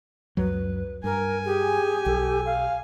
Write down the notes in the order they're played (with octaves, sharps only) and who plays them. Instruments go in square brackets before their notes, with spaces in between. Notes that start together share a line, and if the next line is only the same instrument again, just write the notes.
[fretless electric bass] C#2 F#2 F#3 [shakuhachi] B4
[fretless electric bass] G2 [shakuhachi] A#4 [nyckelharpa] G#5
[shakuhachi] G4 [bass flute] G#4
[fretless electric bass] B1 [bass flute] A4
[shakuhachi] F5